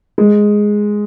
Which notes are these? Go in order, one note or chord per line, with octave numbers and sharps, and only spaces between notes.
G#3